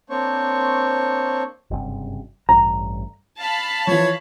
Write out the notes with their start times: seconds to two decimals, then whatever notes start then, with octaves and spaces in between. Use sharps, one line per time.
0.10 A#3 C4 D4 C5 C#5 C#6
1.71 F#1 G2 C3
2.49 A1 G2 A#5
3.40 F5 A5 B5
3.87 E3 F3 C#5